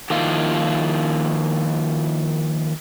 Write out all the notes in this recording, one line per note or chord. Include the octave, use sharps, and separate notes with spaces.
D#3 F3 A#3 E4 F4 F5